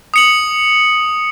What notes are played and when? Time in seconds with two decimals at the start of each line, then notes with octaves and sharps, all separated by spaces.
0.14 D#6 C#7 F#7